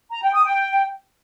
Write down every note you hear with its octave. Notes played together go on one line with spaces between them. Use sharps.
A#5
G5
D#6
G5